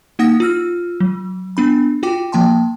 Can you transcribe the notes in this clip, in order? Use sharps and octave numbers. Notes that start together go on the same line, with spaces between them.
A#3 D#4 F#5 D#6 A#6
F4 E6 F6
F#3
B3 D4 B5
F4 F#4 G5 D6
F3 A#3 G5 A5 C6